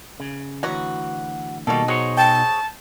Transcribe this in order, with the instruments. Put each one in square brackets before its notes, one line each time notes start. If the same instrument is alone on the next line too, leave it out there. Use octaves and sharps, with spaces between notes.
[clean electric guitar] C#3
[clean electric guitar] D2 E3 [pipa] F#3 F#4
[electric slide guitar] B2 D#4 [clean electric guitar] D#3 G3 A#3 [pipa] F#4 A4
[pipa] F#3 [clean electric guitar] G#4 C5 C#5
[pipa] G5 [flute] A5